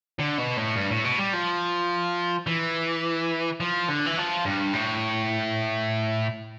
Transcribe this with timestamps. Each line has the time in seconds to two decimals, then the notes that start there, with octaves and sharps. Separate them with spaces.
0.19 D3
0.38 B2
0.57 A2
0.76 G2
0.91 A2
1.05 B2
1.18 G3
1.33 F3
2.47 E3
3.60 F3
3.88 D3
4.06 E3
4.18 F3
4.45 G2
4.73 A2